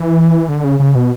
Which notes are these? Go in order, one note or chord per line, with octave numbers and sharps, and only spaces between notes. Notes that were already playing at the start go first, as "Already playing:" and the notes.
Already playing: E3
D3
C#3
C#3
B2